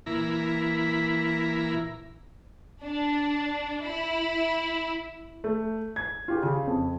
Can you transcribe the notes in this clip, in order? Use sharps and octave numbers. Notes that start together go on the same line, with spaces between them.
A#2 E3 E4 A#5 B5
D4
E4
A3
G#6
F4 G4 G#4
C#3
F2